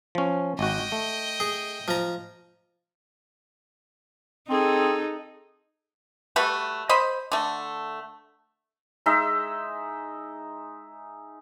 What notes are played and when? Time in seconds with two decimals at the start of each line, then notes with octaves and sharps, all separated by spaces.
0.15 F3 C#4
0.59 G#1 F#4 D#5 G5
0.92 A3
1.40 G#4
1.88 F3 A#5
4.49 C4 D#4 G#4 A4
6.36 G3 A3 F#4 B4
6.89 C5 D#5 B5
7.32 D3 A3
9.06 G#3 D#4 E5